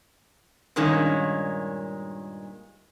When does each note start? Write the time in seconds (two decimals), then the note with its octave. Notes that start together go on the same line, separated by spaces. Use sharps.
0.76 G2 A#2 D#3 G#3 C#4